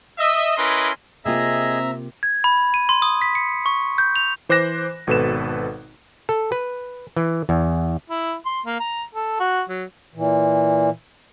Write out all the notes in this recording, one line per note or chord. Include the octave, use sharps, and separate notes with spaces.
D#5 E5
C#4 E4 A#4 B4 D#5 C6
C3 A#3 C4 F4 G#4 D#5 E5 A#5
G#6
B5
D#7
C6
D#6
B6
C#7
C#6
G6
F7
E3 C5 D6 F#6 A#6 E7
G#1 B2 A4 B4 E7
A4
B4
E3
E2
E4
C6
A#3
A#5
A4
F#4
F#3
A#2 E3